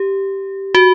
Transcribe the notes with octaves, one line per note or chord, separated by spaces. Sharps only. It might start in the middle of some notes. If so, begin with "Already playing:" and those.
Already playing: G4
F#4